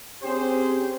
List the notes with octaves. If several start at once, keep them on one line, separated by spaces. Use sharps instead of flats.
C4 C#4 G4 G#4 C5